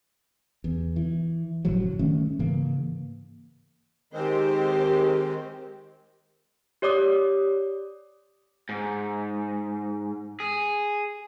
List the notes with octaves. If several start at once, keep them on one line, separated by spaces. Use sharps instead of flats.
E2
E3
F#1 A2 F3 F#3
D#3 G3 A3 C#4
G#2 C#3 E3 A#3
D#3 G#3 C4 G4 C5
G4 C#5 D5 D6 D#6
G#2
G#4